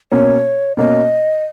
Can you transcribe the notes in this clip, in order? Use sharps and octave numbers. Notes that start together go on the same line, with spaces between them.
B2 A#3 C#4 C#5
B2 A#3 C#4 D#5